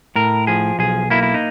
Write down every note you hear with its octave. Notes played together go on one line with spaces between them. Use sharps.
A2 A#4
F3 G#4
B1 G#4
A#3 E4
E4
D#4